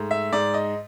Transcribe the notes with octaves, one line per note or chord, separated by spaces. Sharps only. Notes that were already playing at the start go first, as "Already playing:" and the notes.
Already playing: G#2 A3
E5
G#2 D5
D#5